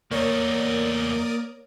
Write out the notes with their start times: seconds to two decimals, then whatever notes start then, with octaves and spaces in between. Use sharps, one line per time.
0.11 E2 A3 A#3 A#4 C#5 D5 D#6